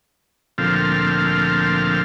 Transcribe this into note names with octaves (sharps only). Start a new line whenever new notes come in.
D2 A#2 F3 C4 A4 F6